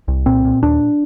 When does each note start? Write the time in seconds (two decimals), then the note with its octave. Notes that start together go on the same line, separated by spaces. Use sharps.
0.08 C2
0.26 A#2 C4
0.45 A#2
0.63 D#2 D4